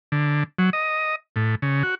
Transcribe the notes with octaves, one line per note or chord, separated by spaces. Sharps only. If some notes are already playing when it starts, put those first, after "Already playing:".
D3
F#3
D#5
A2
C#3
F#4